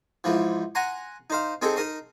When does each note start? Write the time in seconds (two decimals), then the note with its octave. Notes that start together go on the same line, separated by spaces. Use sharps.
0.24 G#2 E3 F3
0.75 F#5 G#5 A#5 C6
1.30 D#4 C5 F5
1.62 C4 D#4 G#4 A4
1.76 D#4 A#4 D#5 C6